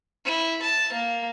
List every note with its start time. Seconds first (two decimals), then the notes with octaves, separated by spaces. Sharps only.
0.25 E4
0.62 A5
0.93 A#3